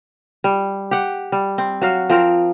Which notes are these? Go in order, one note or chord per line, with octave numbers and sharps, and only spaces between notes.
G3
G4 F#5
G3
C4
F#3 F#4 F5
F3 C4 A#4